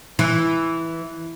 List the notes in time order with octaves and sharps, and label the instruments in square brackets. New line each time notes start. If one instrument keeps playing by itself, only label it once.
[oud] E3